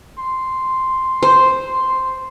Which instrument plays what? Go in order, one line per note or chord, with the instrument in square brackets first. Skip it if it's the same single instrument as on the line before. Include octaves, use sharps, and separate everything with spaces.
[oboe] C6
[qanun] C5